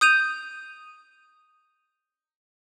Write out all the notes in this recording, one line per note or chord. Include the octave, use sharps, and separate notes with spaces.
D#6 G6 D#7 F7